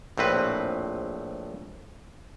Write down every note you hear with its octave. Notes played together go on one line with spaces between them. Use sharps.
A#1 A2 C4 B4